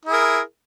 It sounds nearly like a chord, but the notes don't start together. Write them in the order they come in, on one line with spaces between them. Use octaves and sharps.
E4 G#4 A#4